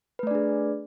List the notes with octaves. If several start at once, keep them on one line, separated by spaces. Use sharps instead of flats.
A3 D4 G#4 B4 D5